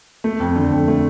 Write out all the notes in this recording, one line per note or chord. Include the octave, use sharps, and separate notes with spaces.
A3
F2
D3
F2
A3